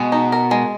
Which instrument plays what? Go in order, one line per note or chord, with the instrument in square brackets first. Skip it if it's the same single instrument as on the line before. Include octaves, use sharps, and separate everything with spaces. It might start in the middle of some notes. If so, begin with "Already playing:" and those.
Already playing: [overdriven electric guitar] B2 [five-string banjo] G#3
[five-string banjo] D#4
A#4
G#3